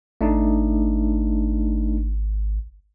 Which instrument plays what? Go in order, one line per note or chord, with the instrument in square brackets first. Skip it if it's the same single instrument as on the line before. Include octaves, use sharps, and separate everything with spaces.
[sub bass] G#1 [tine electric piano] A3 D4 D#4